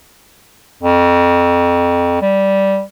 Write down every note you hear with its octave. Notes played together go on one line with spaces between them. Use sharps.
F2
G3